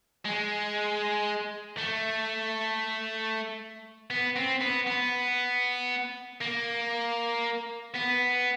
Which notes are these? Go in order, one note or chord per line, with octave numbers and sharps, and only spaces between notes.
G#3
A3
B3
C4
B3
B3
A#3
B3